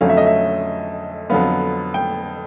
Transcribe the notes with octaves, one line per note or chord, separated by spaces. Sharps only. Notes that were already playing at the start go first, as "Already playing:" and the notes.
F2 D3 F#3 A3 C#4 F5
E5
D#5
E5
F2 D3 F#3 B3 F5
G5